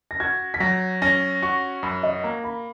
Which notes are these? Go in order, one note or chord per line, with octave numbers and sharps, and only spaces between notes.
A#6
F#4 G#6
B6
F#3 A#6
C#4 A#6
F#4 C#6
F#2 B5
D#5
A#3 A#5
B5